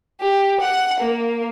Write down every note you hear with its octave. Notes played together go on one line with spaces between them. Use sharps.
G4
F#5
A#3